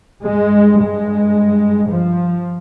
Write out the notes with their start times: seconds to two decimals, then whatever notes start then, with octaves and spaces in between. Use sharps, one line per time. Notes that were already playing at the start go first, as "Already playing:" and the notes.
0.24 G2 G#3
0.80 G#3
1.91 F3